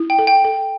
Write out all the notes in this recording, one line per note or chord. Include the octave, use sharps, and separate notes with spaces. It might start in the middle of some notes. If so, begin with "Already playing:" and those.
Already playing: E4
G5
A4
G5
A4